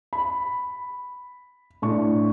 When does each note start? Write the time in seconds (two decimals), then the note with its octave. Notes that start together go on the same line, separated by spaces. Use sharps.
0.13 B5
1.82 A2 D4 C#6